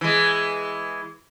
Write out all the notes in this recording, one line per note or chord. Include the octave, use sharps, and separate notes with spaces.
E3 G#3